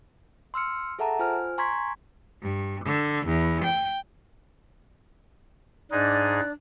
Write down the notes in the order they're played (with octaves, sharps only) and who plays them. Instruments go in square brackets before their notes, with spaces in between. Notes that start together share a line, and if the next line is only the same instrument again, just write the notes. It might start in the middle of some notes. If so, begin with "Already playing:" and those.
[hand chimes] C6 E6 F6 C#7
G#4 A4 E5 F#5 A5 A#5
F4 C5 G#5 F6
G#5 A#5 C6 C#6 G#6 B6
[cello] G2
D3
E2
G5
[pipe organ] G#2 D#4 G#4 [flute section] D4 D5 F#6